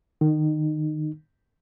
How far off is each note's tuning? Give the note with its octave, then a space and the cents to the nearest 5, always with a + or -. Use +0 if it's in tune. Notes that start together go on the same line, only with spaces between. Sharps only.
D#3 -20 D#4 -25